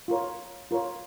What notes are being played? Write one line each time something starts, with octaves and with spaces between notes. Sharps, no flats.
F4 A#4 C#5
F4 A#4 C#5